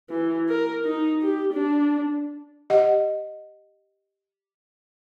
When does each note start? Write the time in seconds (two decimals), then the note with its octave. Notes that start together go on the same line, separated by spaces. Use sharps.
0.10 E3
0.49 A#4
0.86 D#4
1.22 G4
1.53 D4
2.70 G4 D#5 F#5